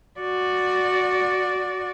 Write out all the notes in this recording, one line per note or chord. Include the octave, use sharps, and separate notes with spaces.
F#4 D5